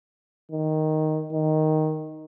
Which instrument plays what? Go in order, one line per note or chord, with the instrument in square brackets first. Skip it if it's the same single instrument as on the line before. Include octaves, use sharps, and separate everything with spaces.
[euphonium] D#3
D#3